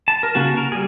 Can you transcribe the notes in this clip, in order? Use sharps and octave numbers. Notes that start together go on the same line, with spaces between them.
A5
A#4
C#3 A#3 F#4 A5
A#4
G3 G#4